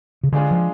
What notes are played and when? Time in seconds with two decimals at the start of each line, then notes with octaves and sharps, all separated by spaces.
0.23 C#3
0.32 D3 G#3 D4 F4 G#4
0.51 F3